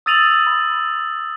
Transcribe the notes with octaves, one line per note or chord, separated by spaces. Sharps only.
D#6 E6 A6 D#7 F7 F#7
B5